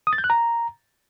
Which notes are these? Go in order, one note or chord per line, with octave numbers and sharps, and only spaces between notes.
D#6
A6
G6
F#6
A#5